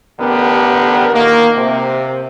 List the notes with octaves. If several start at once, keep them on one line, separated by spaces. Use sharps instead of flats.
A1 D3 B3 G4 A#4
A#2 D#3 A#3
C3